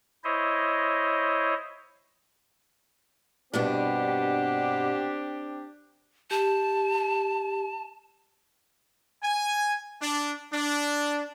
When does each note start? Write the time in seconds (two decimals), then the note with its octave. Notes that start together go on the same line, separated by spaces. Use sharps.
0.24 E4 C5 C#5 D#5
3.54 G2 B2 B3 C4 D4 G4
6.31 G4 A5
9.23 G#5
10.01 D4
10.52 D4